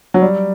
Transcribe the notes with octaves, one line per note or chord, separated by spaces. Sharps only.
F#3
G3